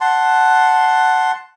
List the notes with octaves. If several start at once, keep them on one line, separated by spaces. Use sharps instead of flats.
F#5 A5 C6